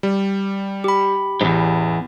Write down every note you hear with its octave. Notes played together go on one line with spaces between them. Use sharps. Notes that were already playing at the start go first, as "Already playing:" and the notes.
G3
G4 B5
A1 E2 G#2